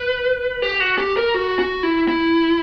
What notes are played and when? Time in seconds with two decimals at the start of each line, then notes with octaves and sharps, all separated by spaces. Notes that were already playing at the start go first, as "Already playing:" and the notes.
Already playing: B4
0.62 G4
0.80 F#4
0.98 G4
1.17 A#4
1.34 F#4
1.59 F#4
1.83 E4
2.08 E4